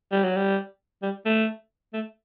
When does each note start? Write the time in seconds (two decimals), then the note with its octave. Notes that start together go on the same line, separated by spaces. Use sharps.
0.12 G3
0.24 F#3
0.36 G3
1.03 G3
1.25 A3
1.94 A3